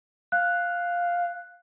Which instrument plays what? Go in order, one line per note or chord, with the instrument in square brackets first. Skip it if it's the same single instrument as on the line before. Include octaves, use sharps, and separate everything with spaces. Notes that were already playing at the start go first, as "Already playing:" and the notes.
[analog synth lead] F5 [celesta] F#6